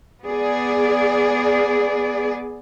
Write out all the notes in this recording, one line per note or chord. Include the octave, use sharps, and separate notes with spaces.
B3 G#4 D5